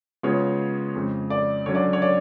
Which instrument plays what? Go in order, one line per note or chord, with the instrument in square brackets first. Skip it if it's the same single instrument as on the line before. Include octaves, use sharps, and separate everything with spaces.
[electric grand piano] C#3 G#3 B3 F4 [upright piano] C#5
[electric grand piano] F2 C#3 G#3
[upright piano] D5
[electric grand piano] D3 F#3 C#4 [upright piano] C#5
[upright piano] D5
C#5
D5